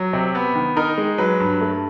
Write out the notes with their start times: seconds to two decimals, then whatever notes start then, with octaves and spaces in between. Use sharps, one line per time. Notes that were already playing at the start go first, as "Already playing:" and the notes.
Already playing: F#3
0.13 C3
0.35 B3
0.55 D#3
0.77 D#4 A#4
0.98 G#3
1.18 F#3 B4
1.40 G2
1.61 A3